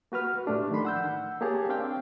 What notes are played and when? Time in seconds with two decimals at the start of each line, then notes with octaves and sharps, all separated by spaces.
0.12 A#3 F#4 B4 F6
0.46 A2 A3 D4 G4
0.71 D#3 F3 D4 B5 C6
0.85 F#5 E6 G6
1.41 A#3 G4 G#4 C#5 A5
1.69 C4 D4 F5 G5